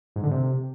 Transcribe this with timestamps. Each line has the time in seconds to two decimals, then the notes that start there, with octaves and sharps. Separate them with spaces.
0.16 G#2
0.24 D3
0.31 C3